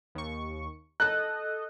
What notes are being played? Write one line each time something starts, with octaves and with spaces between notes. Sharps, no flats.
D#2 C#6
A4 D#5 F#6